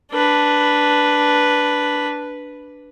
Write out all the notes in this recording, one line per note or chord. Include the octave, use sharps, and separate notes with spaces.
D4 B4